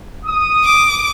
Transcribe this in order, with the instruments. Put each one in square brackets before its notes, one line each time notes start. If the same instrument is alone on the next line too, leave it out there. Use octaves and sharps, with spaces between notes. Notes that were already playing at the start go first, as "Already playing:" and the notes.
[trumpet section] D#6
[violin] D6